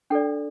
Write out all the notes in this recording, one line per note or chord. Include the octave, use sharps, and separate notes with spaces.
D4 A4 D5 G5